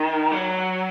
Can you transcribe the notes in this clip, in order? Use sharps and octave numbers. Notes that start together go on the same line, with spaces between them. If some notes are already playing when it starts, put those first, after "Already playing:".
Already playing: D#3
F#3